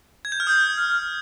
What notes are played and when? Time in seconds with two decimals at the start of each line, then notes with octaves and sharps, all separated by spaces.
0.25 G#6
0.32 G6
0.40 F6
0.47 D#6 G6
0.77 F6